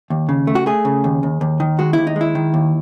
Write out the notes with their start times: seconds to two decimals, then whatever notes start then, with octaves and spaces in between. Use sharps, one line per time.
0.10 D#2
0.29 C#3
0.47 A3
0.55 F#4
0.66 A3 G#4
0.85 C#3
1.04 D#2
1.23 D#2
1.41 D#2
1.60 D#3
1.79 G#3 F#4
1.93 D#2 E4
2.07 D#4
2.16 G#3
2.21 E4
2.35 D#3
2.54 D#2